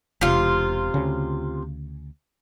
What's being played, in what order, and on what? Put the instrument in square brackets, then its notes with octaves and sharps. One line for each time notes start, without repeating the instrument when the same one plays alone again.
[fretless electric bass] E1 [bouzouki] C3 F4
[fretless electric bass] D2 C#3